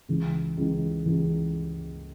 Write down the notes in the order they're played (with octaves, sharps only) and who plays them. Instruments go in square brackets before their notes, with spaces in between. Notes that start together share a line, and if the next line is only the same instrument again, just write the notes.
[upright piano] C#2 C#3 E3
C#2 C#3 E3
C#2 C#3 E3